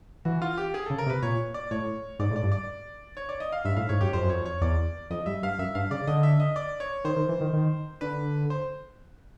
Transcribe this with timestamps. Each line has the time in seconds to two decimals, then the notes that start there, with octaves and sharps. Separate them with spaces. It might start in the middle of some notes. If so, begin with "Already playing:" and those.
0.25 E3 F#4
0.42 F4
0.57 G4
0.74 G#4
0.86 C#3 A4
0.98 A#4
1.06 C3
1.10 B4
1.22 A#2 C#5
1.54 D5
1.71 A2 C#5
2.19 G#2 D5
2.31 A2
2.36 D5
2.43 G2
2.52 D5
3.17 C#5
3.29 D5
3.40 D#5
3.52 F5
3.65 G2 E5
3.77 A2 F5
3.89 G#2 C#5
4.01 F#2 G4
4.13 F2 C5
4.23 F#2
4.29 F2 C#5
4.46 C#5
4.61 E2 D5
5.10 F2 D#5
5.26 G2 E5
5.43 G2 F5
5.59 F#2 E5
5.75 G2 F5
5.91 C#3 D5
6.07 D3 D#5
6.23 E5
6.40 D#5
6.56 D5
6.80 C#5
7.04 D#3 C5
7.16 D#3
7.29 E3
7.41 D#3
7.53 D#3
8.01 D3 B4
8.50 C5